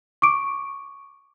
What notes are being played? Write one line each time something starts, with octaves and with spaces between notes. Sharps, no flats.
C#6 D6 D7